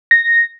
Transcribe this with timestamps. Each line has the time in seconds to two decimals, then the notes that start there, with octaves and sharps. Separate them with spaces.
0.11 A#6